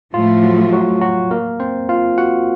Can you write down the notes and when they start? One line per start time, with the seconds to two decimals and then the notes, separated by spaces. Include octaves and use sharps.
0.14 A2 F3 A3 F4
0.43 F#3 F#4
0.72 F#3 F#4
1.01 F#3 F#4
1.31 A#3 A#4
1.60 C4 C5
1.89 F4 F5
2.18 F#4 F#5